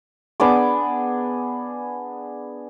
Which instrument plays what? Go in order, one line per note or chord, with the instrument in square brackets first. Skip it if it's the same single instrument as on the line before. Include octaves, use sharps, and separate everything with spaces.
[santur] B3 D4 G#4 D6